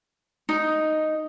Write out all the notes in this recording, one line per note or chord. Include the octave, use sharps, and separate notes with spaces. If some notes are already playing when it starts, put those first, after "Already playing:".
D#4